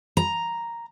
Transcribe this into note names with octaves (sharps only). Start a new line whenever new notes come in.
A#5